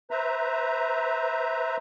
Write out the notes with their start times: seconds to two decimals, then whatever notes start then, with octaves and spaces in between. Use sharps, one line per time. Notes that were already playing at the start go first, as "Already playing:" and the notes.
0.11 B4 C5 E5 A#5